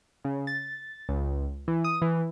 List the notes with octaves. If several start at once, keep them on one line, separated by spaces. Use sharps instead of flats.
C#3
A6
C#2
E3
D#6
E3